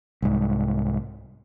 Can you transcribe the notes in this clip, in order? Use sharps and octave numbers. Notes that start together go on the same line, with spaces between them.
C2 G#2